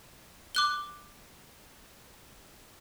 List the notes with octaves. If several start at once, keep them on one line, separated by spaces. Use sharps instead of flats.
D6 F#6 G7